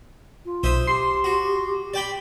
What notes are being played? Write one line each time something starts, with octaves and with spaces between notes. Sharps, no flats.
F4
B1 C5 E5 D#6
G4 C6
F#4
D5 G5 B5